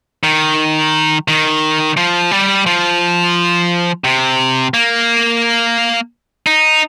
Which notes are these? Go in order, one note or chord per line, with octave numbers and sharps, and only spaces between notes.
D#3
D#3
F3
G3
F3
C3
A#3
D#4